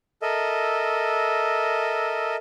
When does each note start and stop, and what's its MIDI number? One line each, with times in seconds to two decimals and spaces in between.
0.22 2.36 69
0.22 2.36 70
0.22 2.36 75
0.22 2.36 76